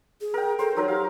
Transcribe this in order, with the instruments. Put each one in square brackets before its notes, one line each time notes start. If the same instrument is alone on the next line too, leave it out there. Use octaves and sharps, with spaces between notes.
[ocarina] G#4
[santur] A#4 G5
[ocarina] A4 [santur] C5
[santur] F#3 A#4 [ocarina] D#4
[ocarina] G4 [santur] F5